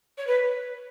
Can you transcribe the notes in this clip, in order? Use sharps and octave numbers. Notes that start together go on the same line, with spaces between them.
C#5
B4